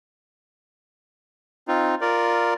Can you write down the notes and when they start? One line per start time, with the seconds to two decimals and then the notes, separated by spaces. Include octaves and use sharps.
1.68 C4 D#4 F4
2.01 F4 A#4 D5